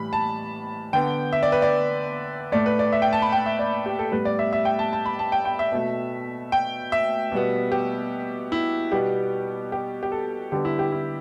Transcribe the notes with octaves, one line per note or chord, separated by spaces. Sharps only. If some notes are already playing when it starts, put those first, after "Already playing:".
Already playing: A2 E3 G3 B5
A5
D3 B3 G5
E5
D5
B4
D5
A2 A3 D5
B4
D5
E5
G5
A5
B5
G5
E5
D5
G4
A4
A2 G3 B3 B4
D5
E5
E5
G5
A5
A5
B5
A5
G5
G5
E5
B2 A3
G5
E5
B2 G3 B3
G4
E4
B2 G3 B3 G4
G4
G4
A4
D3 G3 B3 G4
E4
G4
E4